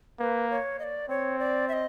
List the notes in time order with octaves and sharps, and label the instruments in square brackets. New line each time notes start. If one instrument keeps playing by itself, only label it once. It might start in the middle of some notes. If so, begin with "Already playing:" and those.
[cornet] A#3 [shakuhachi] B4
[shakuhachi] C#5
D#5
D5
[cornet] C4 [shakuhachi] C#5
[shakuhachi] D5
E5
D#5